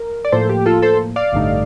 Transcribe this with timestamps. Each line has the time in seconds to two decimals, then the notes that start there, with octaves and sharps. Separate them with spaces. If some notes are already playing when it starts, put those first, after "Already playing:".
Already playing: A#4
0.25 D5
0.32 A2 F3 A#3 A4 C5
0.49 G4
0.66 F4 A4
0.82 A4 C5
1.16 D5 F5
1.32 A1 G2 D3 A3 D#4